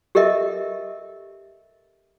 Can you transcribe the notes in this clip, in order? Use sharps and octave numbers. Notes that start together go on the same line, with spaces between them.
G4 A4 A#4 D#5 E5